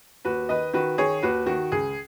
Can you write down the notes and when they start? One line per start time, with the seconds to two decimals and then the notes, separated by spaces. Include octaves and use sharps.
0.25 D#2 F#4 B4
0.49 D#3 B4 D#5
0.73 D#3 F#4 B4
0.98 D#3 G#4 C#5
1.23 D#2 F#4 B4
1.46 D#3 F#4
1.72 C#2 G#4